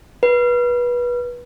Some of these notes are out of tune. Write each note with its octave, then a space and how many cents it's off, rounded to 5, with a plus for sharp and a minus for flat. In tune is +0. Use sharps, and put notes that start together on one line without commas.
B4 -25